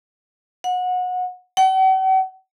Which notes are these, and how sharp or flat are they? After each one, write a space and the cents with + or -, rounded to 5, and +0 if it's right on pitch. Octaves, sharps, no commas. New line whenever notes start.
F#5 -25
F#5 +45